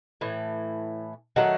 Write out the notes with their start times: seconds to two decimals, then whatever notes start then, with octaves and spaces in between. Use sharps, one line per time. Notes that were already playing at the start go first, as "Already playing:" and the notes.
0.21 A2 E3
1.36 D#3 F#3 A3 F#5